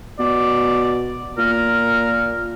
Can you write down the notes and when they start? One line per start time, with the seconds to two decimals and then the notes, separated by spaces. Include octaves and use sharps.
0.19 B2 D5
1.38 A#2 A#4